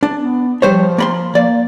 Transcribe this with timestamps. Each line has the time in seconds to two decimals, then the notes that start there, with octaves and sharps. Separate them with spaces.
0.03 D4
0.16 B3
0.62 F3 G3 C5 C#5
0.98 A#3 B5 C6
1.35 A#3 D5